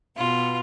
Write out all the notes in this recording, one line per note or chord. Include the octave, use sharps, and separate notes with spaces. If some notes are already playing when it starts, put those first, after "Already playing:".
B2 B3 F4